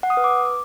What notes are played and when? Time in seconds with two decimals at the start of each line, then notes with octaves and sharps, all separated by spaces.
0.03 F#5
0.10 D#6
0.17 B4
0.24 D6